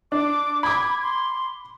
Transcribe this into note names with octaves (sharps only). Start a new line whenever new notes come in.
D4 D6
B5 D6 G#6
C6